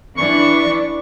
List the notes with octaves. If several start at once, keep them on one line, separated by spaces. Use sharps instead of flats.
E3 D4 C#6